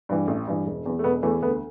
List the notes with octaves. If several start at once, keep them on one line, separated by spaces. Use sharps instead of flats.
G2 E3
A1
G2 E3
E1
E2 E3
A3
E1 B3
E2 E3 A3
D2 B3